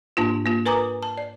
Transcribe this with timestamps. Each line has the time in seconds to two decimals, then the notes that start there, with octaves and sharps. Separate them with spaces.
0.17 G#2 A#3 D4 F4
0.46 A#3 F4
0.66 A#4 B4 G#5 A#5 D6 D#6
1.03 A5
1.18 D5